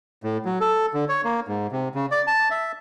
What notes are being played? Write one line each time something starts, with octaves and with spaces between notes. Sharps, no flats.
A2
F#3
A4
D3
C#5
A#3
G#2
C3
C#3
D5
A5
E5